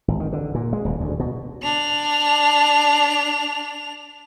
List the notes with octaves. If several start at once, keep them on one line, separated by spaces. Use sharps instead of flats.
G#1
D#3
D3
A#2
G#3
D#1
D2
B2
D4 F7